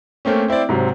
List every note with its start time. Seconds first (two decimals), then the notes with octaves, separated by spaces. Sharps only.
0.25 A3 A#3 C4 C#4
0.48 C4 E4 C5 D5
0.69 G#2 C3 F#3